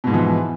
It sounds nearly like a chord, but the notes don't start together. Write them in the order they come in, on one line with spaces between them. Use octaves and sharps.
B2 G#2 F3 E3